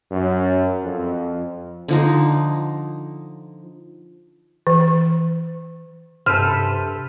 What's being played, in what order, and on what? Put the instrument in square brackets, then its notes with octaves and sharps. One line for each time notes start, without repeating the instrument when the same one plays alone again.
[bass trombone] F#2
F2
[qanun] D3 F3 D#4
[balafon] E3
[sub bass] G2 [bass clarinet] C3 [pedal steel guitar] A4 B4 C5 [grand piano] F6